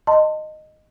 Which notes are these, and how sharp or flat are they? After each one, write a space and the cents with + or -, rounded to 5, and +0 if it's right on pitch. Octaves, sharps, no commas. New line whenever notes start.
D#5 -10 A5 +30 C6 +0